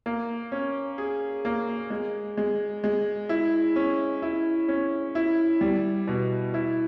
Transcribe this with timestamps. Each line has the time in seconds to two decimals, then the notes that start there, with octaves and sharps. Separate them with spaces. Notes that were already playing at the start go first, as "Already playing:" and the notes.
0.06 A#3
0.52 C#4
0.98 G#4
1.45 A#3
1.90 G#3
2.37 G#3
2.84 G#3
3.29 E4
3.76 C#4
4.22 E4
4.68 C#4
5.15 E4
5.61 G3
6.07 B2
6.54 E4